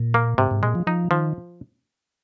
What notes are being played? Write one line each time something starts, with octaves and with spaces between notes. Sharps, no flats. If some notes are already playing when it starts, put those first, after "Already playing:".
Already playing: A#2
A#3
G#2 C3
G#2
A#2 G#3
F3
F3 D#4
D#3 F3